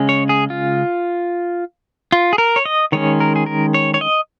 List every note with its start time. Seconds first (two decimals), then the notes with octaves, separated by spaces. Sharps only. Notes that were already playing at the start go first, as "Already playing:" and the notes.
Already playing: C#3 G#3 C#4
0.09 C#5
0.29 G#4
0.50 F4
2.12 F4
2.33 G#4
2.38 A#4
2.56 C#5
2.65 D#5
2.92 D#3 G#3 C#4 C#5
3.20 A#4
3.36 G#4
3.46 A#4
3.74 C#5
3.94 C#5
4.01 D#5